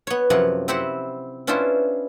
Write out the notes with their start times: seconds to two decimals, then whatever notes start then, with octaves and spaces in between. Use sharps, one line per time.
0.07 B3 C#5
0.30 F#2 C3 F3 C#5 F#5
0.68 C4 E4 G4 C5 F#5
1.47 B3 C#4 D4 E4 F4 C5